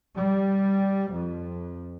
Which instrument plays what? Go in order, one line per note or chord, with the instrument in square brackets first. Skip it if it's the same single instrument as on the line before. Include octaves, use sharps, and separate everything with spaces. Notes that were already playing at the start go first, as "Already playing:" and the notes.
[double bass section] G3
F2